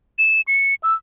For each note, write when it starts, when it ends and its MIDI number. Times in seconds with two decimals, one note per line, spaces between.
0.19 0.41 100
0.48 0.75 97
0.83 0.94 88